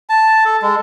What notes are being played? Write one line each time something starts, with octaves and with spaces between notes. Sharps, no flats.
A5
A4
G#3